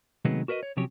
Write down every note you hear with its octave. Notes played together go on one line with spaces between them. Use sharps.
C3 D#3 F#3 G#3 A3 B3
F#4 A#4 B4 D5 D#5
C#5
C3 F3 F#3 C#4 G4 C#5